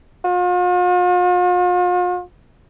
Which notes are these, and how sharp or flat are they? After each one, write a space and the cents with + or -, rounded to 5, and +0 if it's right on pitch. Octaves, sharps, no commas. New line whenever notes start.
F4 +45